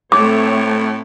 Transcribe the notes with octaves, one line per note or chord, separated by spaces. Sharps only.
A2 A3 C4 C#5 D6